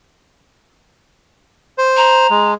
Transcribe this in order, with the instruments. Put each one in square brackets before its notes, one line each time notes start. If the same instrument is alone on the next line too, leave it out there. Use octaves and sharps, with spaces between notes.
[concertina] C5
[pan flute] A#5
[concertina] G#3